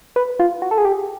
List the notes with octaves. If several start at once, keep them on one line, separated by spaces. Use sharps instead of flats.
B4
F4
F#4
A4
G#4
G4